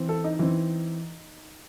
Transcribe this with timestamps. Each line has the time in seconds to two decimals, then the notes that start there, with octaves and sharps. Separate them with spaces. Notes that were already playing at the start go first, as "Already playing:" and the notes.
Already playing: E3 C4
0.09 A4
0.24 D#4
0.39 E3 C4